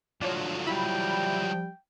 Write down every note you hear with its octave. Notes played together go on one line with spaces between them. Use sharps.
A2 D3 F3 F#3 D4 C#5
G3 E4 G5 B5